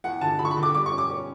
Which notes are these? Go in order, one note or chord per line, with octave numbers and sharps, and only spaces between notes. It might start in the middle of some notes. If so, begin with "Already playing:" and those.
E2 F#5
D3 A5
D3 B5
C#6
B5
D3
D6
G3 D6
C#6
C#4
D6
C#4